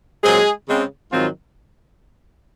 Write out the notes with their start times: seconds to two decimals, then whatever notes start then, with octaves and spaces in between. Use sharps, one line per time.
0.24 A#2 F#3 G#3 C4 G#4
0.68 C#3 G#3 C4
1.12 G#2 D#3 F3 F#3 C4 F4